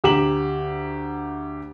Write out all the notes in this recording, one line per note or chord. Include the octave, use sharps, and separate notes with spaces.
D2 G4 A#5 E7 F#7